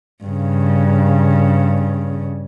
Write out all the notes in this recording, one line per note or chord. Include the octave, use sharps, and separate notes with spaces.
G2 C#3